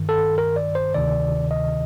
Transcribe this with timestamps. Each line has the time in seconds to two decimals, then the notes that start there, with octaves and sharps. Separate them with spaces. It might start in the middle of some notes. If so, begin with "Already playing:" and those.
Already playing: G2 D#3
0.09 A4
0.38 A#4
0.56 D5
0.75 C5
0.95 D2 C3 D#3 D5
1.51 D#5